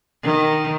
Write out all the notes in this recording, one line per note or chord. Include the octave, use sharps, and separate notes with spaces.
D#3